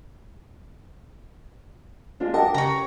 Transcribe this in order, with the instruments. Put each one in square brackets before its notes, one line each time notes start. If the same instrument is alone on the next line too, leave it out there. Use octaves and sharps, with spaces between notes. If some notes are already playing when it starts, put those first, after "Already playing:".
[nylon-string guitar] G#3 D4 F4
[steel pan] G4 [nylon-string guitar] A#4 [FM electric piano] D#5 F#5 A5
[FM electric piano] C#3 [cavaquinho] C#5 A#5